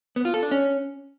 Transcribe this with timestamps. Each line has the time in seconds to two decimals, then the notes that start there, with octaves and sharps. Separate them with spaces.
0.16 B3
0.25 F4
0.34 A4
0.43 D4
0.51 C#4